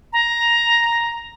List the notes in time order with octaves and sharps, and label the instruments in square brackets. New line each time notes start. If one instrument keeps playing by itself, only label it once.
[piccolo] A#5